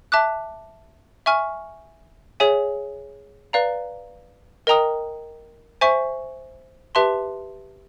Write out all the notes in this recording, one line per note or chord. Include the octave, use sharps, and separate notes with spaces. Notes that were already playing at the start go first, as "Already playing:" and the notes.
E5 A5 D6 F#6
E5 G#5 C#6 F6
G#4 C#5 E5 G#5
B4 D5 F5 A#5
A#4 D#5 G5 A#5 D#6
C5 E5 G#5 C#6
G4 B4 E5 A5 C6